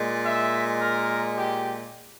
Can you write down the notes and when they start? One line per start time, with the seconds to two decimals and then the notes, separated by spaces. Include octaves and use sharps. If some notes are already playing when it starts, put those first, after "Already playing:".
Already playing: A#2 G#3
0.26 E5
0.81 A#4
1.36 G4